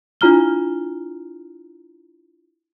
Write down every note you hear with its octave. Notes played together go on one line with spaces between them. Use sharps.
D4 E4 F4 A#5 F6 G7